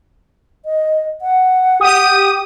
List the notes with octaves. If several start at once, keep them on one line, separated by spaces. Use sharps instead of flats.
D#5
F#5
G4 D#6